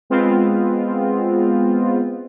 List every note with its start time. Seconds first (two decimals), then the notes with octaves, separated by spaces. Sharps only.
0.10 G#3 B3 C4 F4